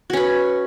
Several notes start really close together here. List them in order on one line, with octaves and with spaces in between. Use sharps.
F#4 C#4 B4